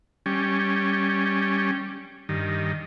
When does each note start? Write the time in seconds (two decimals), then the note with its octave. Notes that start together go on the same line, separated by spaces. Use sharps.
0.26 G3 C#4
2.29 G2 D#3